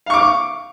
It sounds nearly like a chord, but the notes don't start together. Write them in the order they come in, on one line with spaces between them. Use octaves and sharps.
F5 C#6 D6